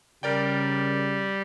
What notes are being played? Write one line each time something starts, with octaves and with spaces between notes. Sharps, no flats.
C#3 G3 A#4 D5 G5